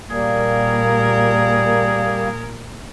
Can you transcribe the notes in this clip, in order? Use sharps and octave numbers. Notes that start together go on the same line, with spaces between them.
A#2 G3 A#3 G#4 A#4